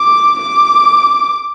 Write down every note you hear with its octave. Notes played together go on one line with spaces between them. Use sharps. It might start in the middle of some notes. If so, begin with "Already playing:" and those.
Already playing: D6
D6